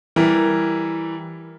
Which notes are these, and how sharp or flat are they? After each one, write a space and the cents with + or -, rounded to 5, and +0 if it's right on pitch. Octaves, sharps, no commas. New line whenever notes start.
E3 +0 G3 +0 A#4 +0